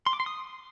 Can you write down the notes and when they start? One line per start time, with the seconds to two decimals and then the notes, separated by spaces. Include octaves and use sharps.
0.06 C6
0.13 D6
0.20 C6
0.26 D#6